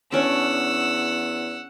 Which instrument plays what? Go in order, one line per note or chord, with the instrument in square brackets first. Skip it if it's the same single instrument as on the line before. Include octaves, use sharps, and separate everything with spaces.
[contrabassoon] E2 [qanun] C#4 D4 [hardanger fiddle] F#5 [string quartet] E6